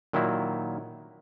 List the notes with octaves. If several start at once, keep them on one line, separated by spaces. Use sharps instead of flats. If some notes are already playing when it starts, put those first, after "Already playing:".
A#2 D#3 F#3 E4